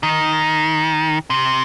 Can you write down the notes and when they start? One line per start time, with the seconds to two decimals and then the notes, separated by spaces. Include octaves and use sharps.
0.03 D#3
1.30 C3